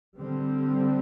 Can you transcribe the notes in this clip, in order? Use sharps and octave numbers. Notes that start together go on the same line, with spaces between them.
D3 G3 C4